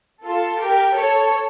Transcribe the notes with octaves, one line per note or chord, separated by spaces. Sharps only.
F4 A4
G4 A#4
A4 C#5